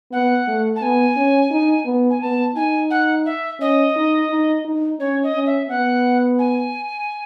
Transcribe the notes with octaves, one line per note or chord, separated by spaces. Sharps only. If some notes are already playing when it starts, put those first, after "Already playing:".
B3 F#5
A3
A5
B3 G#5
C#4
D#4
B3
G#5
B3 A5
D#4 G#5
F#5
E5
C#4 D#5
D#4
D#4
D#4
C#4 C#5
D#5
C#4
E5
B3 F#5
G#5